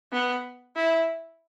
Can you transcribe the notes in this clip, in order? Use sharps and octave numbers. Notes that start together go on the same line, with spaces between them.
B3
E4